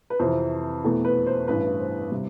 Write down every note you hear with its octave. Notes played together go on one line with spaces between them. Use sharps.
B4
F2 C3 E3 C5
E2 B2 A3
B4
C5
A1 G2 E3 B4
C5
C3 G3 B3